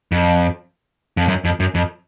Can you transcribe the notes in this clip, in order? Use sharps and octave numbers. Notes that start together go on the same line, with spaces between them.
F2
F2
F#2
F2
F#2
F2